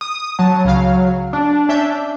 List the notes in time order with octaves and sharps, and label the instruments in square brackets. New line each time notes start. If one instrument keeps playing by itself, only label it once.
[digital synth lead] D#6
[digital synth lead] F#3 [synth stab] A5
[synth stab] C#2 C#3 F5
[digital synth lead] D4
[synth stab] C#4 E5 G6